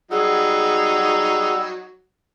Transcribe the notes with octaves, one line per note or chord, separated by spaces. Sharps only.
F#3 G3 D#4 G#4 F#5 E6